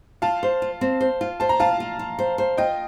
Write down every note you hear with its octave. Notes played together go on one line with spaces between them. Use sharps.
F4 F5 A5
C5
F4
C4
C5
F4
C5 A5
A#5
F4 F5 A5
F4
F4
C5
C5
F4 D#5 G5